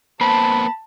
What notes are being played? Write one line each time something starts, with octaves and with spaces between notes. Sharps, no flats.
A#3 B3 C5 A5 B5